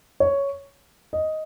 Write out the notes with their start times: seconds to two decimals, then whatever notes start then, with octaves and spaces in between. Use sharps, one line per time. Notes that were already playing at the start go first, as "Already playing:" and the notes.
0.20 C#5
1.13 D#5